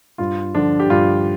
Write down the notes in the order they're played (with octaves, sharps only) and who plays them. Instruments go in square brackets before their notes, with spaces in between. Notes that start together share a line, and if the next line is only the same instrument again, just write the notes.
[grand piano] G2 F4
D3 F3 D4
G4
G2 F4